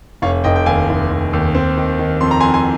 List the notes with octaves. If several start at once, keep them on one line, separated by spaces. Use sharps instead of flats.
F1 C#5 F5
F1 D#5 G5
G5
D#2 F5 G#5
F1
F1
D#2
C4
D#3
D#3
F2 C6
A#5
F2 G#5 C6
G#5 C6